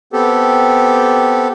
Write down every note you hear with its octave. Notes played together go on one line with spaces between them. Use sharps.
B3 C4 G4 A4